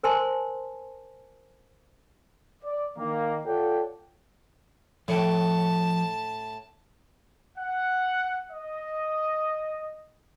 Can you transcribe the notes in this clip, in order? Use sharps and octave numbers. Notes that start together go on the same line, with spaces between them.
A#4 C5 G#5 A5 C6
D5
D#3 A#3
F4 A4 C#5 D5 F#5 G5
A2 F3 C#5 G5 A5
F#5
D#5